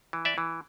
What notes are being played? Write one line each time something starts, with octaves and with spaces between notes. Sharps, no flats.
E3
D5 E5
E3